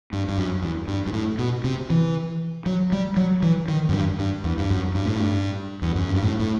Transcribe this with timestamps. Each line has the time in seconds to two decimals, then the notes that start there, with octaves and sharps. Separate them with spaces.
0.13 G2
0.29 G2
0.38 F#2
0.62 E2
0.88 G2
1.07 G2
1.13 A2
1.39 B2
1.64 C3
1.90 E3
2.66 F#3
2.92 G3
3.16 F#3
3.43 E3
3.68 D#3
3.89 F#2
3.93 G2
4.19 G2
4.44 E2
4.58 G2
4.70 F#2
4.95 G2
5.06 A2
5.16 G2
5.82 E2
5.95 F#2
6.08 G2
6.23 A2
6.39 A2